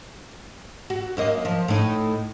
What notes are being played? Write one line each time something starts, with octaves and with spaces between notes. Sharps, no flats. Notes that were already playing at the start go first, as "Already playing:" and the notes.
F#4
F#2 A#3 D#5
F3
A2 D#4